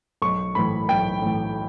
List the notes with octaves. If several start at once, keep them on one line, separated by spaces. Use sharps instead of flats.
B1 C#6
A2 E3 B5
B1 G5
A2 E3